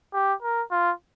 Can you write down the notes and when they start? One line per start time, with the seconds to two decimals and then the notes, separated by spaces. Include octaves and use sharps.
0.14 G4
0.42 A#4
0.71 F4